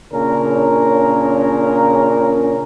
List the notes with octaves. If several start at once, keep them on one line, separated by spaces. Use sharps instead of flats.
A#2 C#3 C#4 D4 A#4